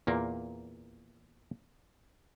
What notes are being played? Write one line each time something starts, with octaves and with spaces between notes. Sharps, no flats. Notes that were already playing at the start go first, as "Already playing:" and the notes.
E2 A#2 A#3